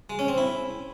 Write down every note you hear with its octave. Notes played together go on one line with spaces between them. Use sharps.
G#3
C#4
C4
E4